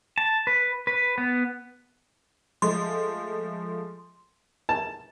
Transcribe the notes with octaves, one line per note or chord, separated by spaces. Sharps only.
A5
B4
B4
B3
F3 G#3 A3 C6
A5